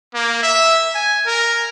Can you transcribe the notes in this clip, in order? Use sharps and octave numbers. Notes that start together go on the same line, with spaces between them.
A#3
E5
G#5
A#4